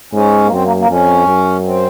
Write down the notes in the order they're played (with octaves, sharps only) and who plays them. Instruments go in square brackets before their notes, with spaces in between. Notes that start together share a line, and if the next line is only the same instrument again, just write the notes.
[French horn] G#2 [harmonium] C#4
[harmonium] A#3
[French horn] F#2 [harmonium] C4
[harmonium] A#3
A#3
[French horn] F2 [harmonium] C#4
[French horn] F#2
[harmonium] C4